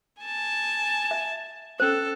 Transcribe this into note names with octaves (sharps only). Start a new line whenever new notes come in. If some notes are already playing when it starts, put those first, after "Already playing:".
G#5 A5
E5
C#4 A4 C5